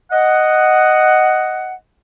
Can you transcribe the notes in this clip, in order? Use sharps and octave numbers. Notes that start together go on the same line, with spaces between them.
D#5 F#5